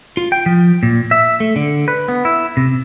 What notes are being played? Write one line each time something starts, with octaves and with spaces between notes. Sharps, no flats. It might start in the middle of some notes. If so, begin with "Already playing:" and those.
F4
G5
F3
A#2
E5
A3
D3
B4
B3
E4
C3